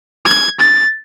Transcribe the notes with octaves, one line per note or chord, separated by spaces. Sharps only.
G#6
A6